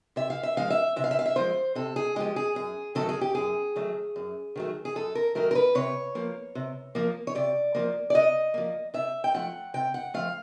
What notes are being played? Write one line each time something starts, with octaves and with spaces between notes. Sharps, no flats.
C3 E5
F5
E5
F3 G#3 F5
E5
C3 E5
F5
E5
F5
E5
F3 G#3 C5
C3 A4
G#4
F3 G#3 G4
G#4
F#2 G#4
D#3 F#3 A3 A4
G#4
G4
F#2 G#4
D#3 F#3 A3
F#2
D#3 F#3 A3
G#4
F#2 A4
A#4
D#3 F#3 A3 A#4
A#4
B4
C3 C#5
F3 A#3
C3
F3 A#3
C#5
C3 D5
F3 A#3
D5
C3 D#5
F3 A#3
C3 E5
G5
F3 A3 F#5
C3 G5
F#5
F3 A3 F5